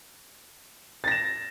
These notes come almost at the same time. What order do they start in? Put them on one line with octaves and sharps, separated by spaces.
A6 A#6 E7